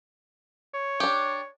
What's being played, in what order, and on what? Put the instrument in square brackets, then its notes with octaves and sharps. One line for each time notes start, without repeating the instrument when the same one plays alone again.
[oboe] C#5
[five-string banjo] D4 G4